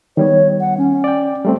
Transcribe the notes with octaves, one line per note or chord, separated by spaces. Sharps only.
D#3 G3 B3 C#5
F#5
C#4
D5 G5
G3 A3 C4